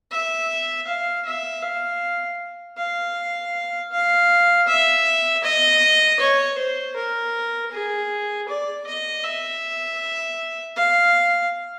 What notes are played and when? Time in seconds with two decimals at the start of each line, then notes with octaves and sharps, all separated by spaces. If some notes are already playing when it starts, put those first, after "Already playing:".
0.12 E5
0.87 F5
1.25 E5
1.63 F5
2.78 F5
3.92 F5
4.68 E5
5.44 D#5
6.20 C#5
6.58 C5
6.96 A#4
7.72 G#4
8.48 D5
8.87 D#5
9.24 E5
10.76 F5